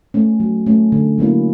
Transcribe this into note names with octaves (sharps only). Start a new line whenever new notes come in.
A3 C#4
F#3
A3 C#4
D3
F#3 A#3 C#4 E4